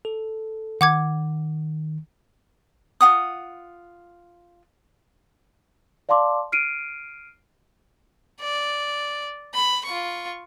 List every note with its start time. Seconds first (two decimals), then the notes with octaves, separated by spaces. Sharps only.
0.05 A4
0.81 D#3 F#5 D6 G#6
3.01 F4 F#5 D#6
6.09 D5 F5 A5 C6 D6
6.52 F6 C7 D7 D#7
8.41 D5
9.54 B5
9.85 F4 C#6